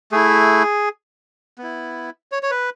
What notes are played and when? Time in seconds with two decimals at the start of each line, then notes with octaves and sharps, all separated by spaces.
0.12 A3 E4 G#4
1.58 B3 E4
2.32 C#5
2.43 C#5
2.51 B4